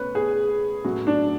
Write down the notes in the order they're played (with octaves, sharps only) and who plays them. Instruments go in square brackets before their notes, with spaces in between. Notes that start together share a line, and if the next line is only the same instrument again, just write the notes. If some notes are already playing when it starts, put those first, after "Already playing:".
Already playing: [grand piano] B2 A3 C#4 [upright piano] B4 C#5
[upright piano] G#4
[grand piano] A2 F#3 C#4 F#4
[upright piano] D4